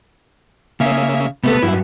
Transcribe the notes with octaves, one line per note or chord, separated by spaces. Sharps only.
C#3 A#3 C#4 E5
C3 A3 B3 A4 B4
G2 F#3 E4